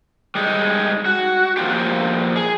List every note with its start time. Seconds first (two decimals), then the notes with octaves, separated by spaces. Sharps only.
0.35 G3 G#3 D#4
1.06 F#4
1.57 F3 A#3 F4 G4
2.36 G#4